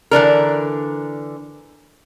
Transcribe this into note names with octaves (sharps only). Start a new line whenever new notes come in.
D3 E3 D4 A#4